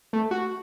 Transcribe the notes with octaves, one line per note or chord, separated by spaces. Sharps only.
A3
F#4